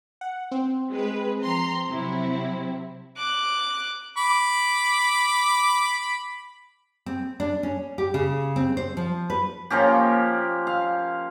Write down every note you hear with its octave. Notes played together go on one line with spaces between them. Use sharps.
F#5
C4
G#3 B4
F3 A#5 C6
C3 F#3 E4
D6 F#6
B5 D6
C4
D4
C#4
G4
C#3
C4
C5
F3
B4
F3 A#3 C#4 G4
F5